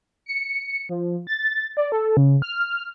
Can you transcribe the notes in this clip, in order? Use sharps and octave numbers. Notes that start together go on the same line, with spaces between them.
C#7
F3
A6
D5
A4
C#3
F6